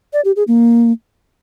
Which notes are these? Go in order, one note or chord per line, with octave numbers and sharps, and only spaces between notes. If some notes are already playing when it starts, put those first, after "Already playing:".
D5
G4
G#4
A#3